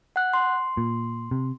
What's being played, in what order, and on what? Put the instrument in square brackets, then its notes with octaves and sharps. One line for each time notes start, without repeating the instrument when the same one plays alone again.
[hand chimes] F#5 F#6
C6
[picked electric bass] A#2
C3